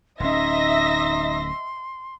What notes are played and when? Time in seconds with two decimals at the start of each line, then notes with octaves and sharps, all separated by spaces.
0.20 D1 C#4 D#4 D#5 E5 C6 A#6